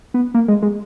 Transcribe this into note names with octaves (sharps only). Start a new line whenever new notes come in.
B3
A#3
G#3
G#3